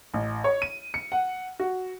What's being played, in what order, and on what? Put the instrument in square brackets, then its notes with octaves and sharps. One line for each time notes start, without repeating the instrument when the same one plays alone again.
[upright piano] A1
C#5
D#7
C#7
F#5
F#4